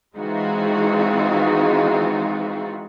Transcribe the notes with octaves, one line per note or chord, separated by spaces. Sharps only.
E3 G#3 C4 D#4 F4 F#4